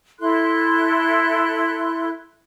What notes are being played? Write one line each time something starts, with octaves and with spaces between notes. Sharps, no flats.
E4 A4 C6 F#6